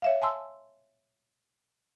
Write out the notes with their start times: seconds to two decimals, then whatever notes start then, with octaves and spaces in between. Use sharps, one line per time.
0.02 C#5 E5 F5
0.22 G#5 A5 C6 E6